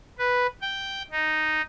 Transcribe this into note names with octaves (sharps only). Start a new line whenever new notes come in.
B4
G5
D#4